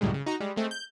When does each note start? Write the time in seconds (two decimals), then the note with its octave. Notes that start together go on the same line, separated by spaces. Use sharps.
0.01 C#2 F#2 A2 C#3 G3 G#3
0.14 C#3
0.26 D#4 F#4 A#5
0.40 G3 G#3
0.56 G#3 A3 C4
0.71 G6